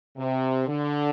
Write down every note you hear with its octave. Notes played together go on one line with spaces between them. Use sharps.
C3
D3